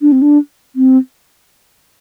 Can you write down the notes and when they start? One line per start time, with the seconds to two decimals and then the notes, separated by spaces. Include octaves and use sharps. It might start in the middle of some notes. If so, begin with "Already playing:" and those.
0.01 D4
0.12 C4
0.22 D4
0.76 C4